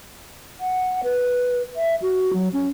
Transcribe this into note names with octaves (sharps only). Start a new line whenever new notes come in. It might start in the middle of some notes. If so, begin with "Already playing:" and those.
F#5
B4
E5
F#4
F#3
C#4